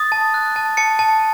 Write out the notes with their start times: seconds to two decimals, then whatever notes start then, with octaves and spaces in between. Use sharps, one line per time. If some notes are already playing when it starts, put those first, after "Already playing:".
Already playing: D#6 A6
0.12 A5
0.34 F#6
0.56 A5
0.77 A5 C#7
0.99 A5